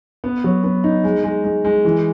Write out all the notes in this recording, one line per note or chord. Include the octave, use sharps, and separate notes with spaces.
B3
F#3
B3
D#4
G#3
G#3
G#3
G#3
E3